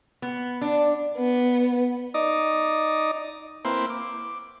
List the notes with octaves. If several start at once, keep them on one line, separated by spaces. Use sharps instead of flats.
B3
D4
B3
D#4 D5 D#5
A#3 C4 E4 B4 C5
D6